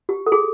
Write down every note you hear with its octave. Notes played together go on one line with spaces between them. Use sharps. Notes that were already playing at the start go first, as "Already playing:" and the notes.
G4
A4
G#4